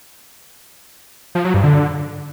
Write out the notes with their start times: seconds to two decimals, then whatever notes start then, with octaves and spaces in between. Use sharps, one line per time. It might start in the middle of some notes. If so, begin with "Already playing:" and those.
1.35 F3
1.45 F#3
1.54 G2
1.64 D3